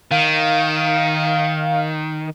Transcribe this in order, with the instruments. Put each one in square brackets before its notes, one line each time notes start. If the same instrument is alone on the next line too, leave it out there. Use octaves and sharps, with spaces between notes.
[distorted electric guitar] D#3 [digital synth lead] F5